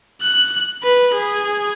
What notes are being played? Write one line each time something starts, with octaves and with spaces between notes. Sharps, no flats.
F#6
B4
G#4